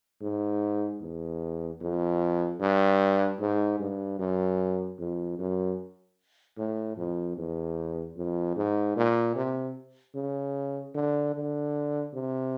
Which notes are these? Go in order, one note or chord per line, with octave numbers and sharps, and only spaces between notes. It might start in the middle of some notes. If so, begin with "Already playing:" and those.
G#2
E2
F2
G2
G#2
G2
F#2
F2
F#2
A2
F2
E2
F2
G#2
A#2
C3
C#3
D3
D3
C3